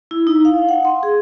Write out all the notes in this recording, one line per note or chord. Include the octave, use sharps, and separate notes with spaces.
E4
D#4
F5
F#5
C6
G#4